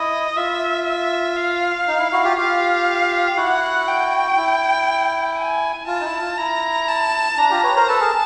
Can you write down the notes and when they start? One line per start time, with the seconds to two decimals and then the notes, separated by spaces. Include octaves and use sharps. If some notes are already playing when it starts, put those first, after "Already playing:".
Already playing: E4 D#5
0.36 F4 E5
0.86 E5
1.36 F5
1.87 D#4
1.99 E4
2.12 E4 F#4
2.24 F4 G4
2.37 F4 G4 F5
3.37 E4 F#4 F#5
3.87 G5
4.37 E4
5.38 G#5
5.87 F4 A5
6.00 D#4
6.05 E4
6.21 F4
6.38 E4 A#5
6.88 A5
7.37 D4 A#5
7.50 F4 G4
7.63 B4 C#5
7.76 A#4 C5
7.88 A4 B4 A5
8.00 G#4 A#4